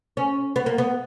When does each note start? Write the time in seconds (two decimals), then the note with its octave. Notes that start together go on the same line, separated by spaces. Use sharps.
0.17 C#4
0.56 B3
0.66 A#3
0.78 B3